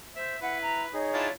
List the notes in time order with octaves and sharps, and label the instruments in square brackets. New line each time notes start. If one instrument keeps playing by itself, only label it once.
[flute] C5 [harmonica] E5
[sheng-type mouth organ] E4 [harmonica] B4 [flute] F#5
[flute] A#5
[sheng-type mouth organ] D#4 G#4 [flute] C#5
[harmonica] D4 E4 F4